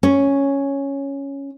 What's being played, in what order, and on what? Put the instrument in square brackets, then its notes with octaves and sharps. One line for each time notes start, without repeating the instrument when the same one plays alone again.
[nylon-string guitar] C#4